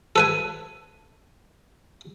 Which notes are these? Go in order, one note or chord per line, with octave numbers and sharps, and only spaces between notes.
A4 B4 G#5